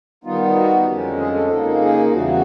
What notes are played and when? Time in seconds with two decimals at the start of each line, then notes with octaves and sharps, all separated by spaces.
0.24 D#3 G3 B3 D#4 F4
0.56 F#4
0.87 F2 D3 F3 G#3 C#4 G4
1.18 G#4
1.34 A4
1.50 C#3 F3 A#3 D#4
1.81 G#4
2.12 E2 C#3 E3 G3 F#4
2.27 F#4